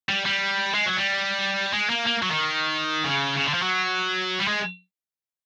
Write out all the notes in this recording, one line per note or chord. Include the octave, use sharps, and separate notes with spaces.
G3
G3
G#3
F#3
G3
G#3
A#3
A#3
F#3
D#3
C#3
C#3
D3
F3
F#3
G3
G#3